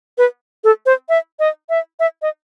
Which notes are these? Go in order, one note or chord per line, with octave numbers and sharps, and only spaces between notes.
B4
A4
C5
E5
D#5
E5
E5
D#5